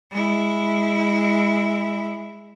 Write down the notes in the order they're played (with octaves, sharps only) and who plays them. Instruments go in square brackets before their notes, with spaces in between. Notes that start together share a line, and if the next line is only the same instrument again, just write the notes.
[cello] G#3 E4